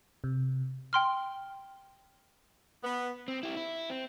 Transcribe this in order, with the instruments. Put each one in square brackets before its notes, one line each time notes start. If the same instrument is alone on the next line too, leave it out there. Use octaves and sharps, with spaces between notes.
[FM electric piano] C3
[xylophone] G5 C6 F6
[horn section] B3
[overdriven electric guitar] C4
E4 G4
E4
C4